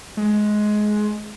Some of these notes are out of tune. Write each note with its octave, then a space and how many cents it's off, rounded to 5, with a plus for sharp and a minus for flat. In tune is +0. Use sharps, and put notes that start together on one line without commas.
G#3 +15